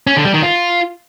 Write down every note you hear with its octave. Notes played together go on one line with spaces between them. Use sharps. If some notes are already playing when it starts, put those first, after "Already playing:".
C#4
D3
G3
D#3
F4